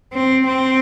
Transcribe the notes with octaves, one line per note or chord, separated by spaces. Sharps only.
C4
C4